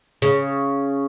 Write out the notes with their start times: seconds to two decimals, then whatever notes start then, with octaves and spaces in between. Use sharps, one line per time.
0.22 C#3